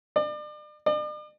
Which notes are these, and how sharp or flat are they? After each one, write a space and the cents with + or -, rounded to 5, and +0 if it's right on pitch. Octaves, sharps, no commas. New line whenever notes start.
D5 +40
D5 +45